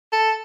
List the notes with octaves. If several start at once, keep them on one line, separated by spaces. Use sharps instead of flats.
A4